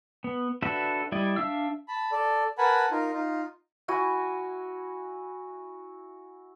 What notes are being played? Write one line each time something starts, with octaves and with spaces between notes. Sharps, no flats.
B3
D4 F#4 A4 B4 E5
G3 E4 D5 D#5
D4 E5 F5 E6
A5 B5
A4 D5
A#4 B4 F#5 G#5 A5 B5
D#4 F4 A#4
D#4 F4
E4 F#4 G#5